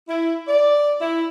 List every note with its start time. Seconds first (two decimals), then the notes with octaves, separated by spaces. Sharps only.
0.08 E4
0.48 D5
1.01 E4